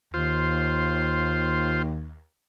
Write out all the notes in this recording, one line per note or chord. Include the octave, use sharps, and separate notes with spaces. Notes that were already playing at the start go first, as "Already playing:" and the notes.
D#2 F4 C5